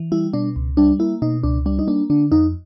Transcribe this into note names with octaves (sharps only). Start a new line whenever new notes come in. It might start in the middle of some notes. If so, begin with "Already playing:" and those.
Already playing: E3
G3 E4
B2 D4
C#2
G3 D4
A#3 E4
B2 D#4
C#2 D4
G3 D4
D#4
A#3 D4
D3 D4
F2 D#4